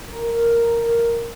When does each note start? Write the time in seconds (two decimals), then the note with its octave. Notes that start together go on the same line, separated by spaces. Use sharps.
0.11 A#4